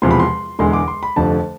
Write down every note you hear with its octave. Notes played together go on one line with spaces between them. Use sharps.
E1 E2 C3 F3 C6
B5
C6
E1 E2 D3 G#3 C6
D6
C6
B5
F1 F2 D3 A5